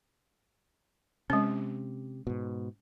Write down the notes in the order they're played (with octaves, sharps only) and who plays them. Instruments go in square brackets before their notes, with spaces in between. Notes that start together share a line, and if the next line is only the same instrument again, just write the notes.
[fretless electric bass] C3 [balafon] G#3 C#4
[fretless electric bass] G#2 B2